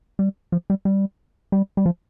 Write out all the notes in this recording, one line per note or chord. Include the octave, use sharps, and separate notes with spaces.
G3
F3
G3
G3
G3
G3
F3